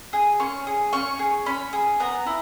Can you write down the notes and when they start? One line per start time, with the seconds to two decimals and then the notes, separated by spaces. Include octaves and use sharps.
0.13 G#4
0.40 C#4 C#6
0.67 G#4
0.93 C#4 C#6
1.19 G#4
1.46 C#4 B5
1.73 G#4
2.00 B3 A#5
2.26 E4